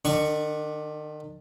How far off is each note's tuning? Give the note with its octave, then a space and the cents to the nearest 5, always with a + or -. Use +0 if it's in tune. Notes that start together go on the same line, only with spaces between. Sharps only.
D#3 -40 D4 +0 C#6 +0